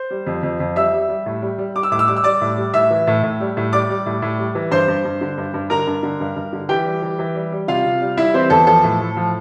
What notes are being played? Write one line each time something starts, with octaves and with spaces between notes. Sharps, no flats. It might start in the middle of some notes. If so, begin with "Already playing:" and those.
Already playing: C5
G3
F2
F2
F2
G3 E5 E6
G3
G3
A2
G3
G3
G3 D6
E6
A2 D6
E6
G3 D6
E6
G3 D5 D6
A2
G3
A2 E5 E6
E3
A2
A2
G3
A2
G3 D5 D6
G3
A2
A2
G3
E3
G2 C5 C6
G2
G2
D3
G2
G2
D3 A#4 A#5
G2
D3
G2
G2
D3
E3 G4 G5
G3
E3
E3
G3
G3
C3 F4 F5
C3
G3
G3 E4 E5
E3 C4 C5
E2 A4
F3 A4
A2
A2
F3